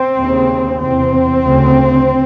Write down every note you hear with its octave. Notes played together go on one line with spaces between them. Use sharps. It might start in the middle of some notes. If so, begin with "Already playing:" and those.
Already playing: C4
D#2 C#3
E2 C3 C4
D2 C#3